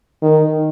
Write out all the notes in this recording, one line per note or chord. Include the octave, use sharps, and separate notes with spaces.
D#3